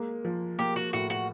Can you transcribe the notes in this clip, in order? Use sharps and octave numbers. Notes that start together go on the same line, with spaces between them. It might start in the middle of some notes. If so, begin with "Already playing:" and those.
Already playing: G#3 A#3
F3
A#3 G4
F#4
A2 F#4
F#4